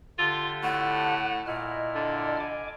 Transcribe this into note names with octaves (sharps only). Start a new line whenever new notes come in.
D3 F4 G4 A4
A2 F#5
A#2 E4 D#5 F6
D3
G#5 D6